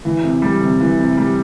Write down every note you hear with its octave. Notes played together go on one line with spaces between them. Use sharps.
E3
C3
G3
C3
E3
C3
G3